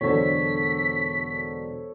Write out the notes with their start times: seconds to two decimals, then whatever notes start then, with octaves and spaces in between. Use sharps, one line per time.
0.01 E1 D3 F#3 A4 C5 C#5 B6